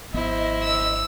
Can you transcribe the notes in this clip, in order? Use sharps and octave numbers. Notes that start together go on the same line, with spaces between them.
G#1 F3 B3 E4 C5 D#5
E6